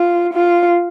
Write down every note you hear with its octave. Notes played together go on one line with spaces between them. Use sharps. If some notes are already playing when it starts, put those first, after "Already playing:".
Already playing: F4
F4